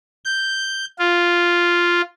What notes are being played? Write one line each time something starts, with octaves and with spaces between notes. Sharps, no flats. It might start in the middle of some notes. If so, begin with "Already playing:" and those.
G6
F4